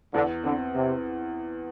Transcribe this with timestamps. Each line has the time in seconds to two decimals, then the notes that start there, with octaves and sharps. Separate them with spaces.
0.14 E2 D3
0.44 D3 C4
0.74 C3 C4